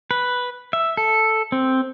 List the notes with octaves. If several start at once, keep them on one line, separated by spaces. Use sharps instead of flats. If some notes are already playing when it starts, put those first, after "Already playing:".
B4
E5
A4
C4